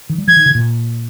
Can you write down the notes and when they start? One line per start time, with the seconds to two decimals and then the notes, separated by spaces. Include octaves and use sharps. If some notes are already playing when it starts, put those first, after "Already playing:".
0.10 D#3
0.18 G3
0.28 F3 G#6
0.36 D#3
0.46 C#3
0.55 A#2